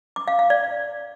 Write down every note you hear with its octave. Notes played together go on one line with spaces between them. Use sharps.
D6
F5
F5
D5